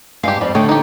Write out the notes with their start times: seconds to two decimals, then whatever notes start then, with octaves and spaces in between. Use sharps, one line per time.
0.23 G2 G#3 G4 F5
0.41 F2 G3
0.55 D3 A3 C#5 D#5 G5
0.69 D#4 G4